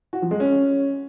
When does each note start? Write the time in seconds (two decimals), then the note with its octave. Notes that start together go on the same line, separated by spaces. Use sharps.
0.13 F#4
0.22 F3
0.31 G#3
0.40 C#4